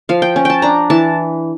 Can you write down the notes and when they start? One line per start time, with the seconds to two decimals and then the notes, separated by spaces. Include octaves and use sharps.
0.09 F3 F5
0.22 G5
0.36 C#4
0.45 G5 A5
0.62 D4 A#5
0.90 E3 A5